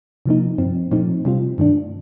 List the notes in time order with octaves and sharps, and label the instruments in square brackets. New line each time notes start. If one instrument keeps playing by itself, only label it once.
[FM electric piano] C3 F3 A#3 D#4
G2 F3 C4
A#2 F3 A3 C4 D#4
C3 G3 C4 F4
G2 D#3 A3 D4